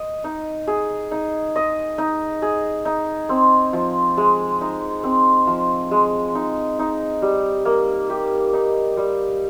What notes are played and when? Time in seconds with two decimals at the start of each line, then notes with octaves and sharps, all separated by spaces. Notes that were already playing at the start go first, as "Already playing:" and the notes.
Already playing: D#5
0.24 D#4
0.67 G#4
1.11 D#4
1.56 D#5
1.98 D#4
2.42 G#4
2.85 D#4
3.29 C4
3.73 F3
4.17 G#3
4.61 D#4
5.03 C4
5.47 F3
5.91 G#3
6.35 D#4
6.79 D#4
7.22 G3
7.65 A#3
8.10 G4
8.53 D#4
8.97 G3